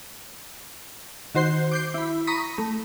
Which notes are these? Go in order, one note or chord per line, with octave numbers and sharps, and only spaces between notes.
D#3 F#4 C5 C6 G6
D6 G6 C7
E4 B5
A#5 B5 C#6 D#6 A#6 B6
A3